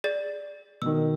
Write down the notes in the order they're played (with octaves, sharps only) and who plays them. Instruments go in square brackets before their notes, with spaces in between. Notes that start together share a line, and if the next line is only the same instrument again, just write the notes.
[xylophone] G#4 D5 A6
[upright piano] B2 D#3 [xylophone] E6